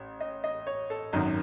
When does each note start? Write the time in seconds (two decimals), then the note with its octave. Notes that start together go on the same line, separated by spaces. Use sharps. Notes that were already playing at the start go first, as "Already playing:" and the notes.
Already playing: A1
0.21 D#5
0.44 D#5
0.67 C#5
0.90 A4
1.13 G#1 F#2 D#3 F#3 D#4